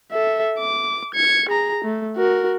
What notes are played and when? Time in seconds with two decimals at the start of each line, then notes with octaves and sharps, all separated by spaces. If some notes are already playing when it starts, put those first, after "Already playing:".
0.12 A4 E5
0.59 D6
1.15 G#6 C#7
1.49 G#4 A#5
1.85 A3
2.17 F#4 A#4